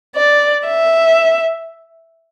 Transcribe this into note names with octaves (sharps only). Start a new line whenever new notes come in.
D5
E5